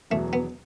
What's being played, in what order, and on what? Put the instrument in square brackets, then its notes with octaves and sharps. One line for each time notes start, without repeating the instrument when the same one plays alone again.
[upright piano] E1 E2 B2 F#3 [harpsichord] A3
[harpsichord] B3